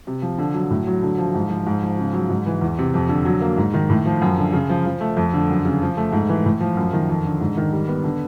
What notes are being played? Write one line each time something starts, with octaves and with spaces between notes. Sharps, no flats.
C3
F3
D3
F#3
A2
F#3
D3
F3
G#2
F3
G#2
F3
C#3
F#3
G#2
E3
E2
C3
F2
D3
F#3
A#3
G#2
D#3
A2
F3
F#2
D3
C#3
F3
F3
A3
F2
D3
F#2
C#3
F3
A3
G#2
E3
A2
F3
F#2
D#3
F2
D3
G#2
D#3
G3
B3
D3